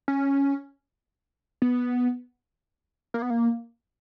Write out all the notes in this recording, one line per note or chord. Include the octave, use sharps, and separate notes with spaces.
C#4
B3
A#3
B3
A#3